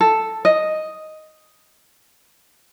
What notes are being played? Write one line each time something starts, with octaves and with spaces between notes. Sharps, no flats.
A4
D#5